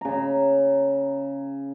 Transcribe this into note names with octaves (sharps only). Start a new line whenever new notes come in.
C#3 A#5